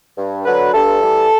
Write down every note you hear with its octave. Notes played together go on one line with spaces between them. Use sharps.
G2
D3 F#3 B4
G2 A4
E3 G3